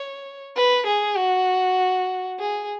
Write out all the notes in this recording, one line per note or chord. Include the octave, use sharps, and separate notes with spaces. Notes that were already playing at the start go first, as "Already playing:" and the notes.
Already playing: C#5
B4
G#4
F#4
G#4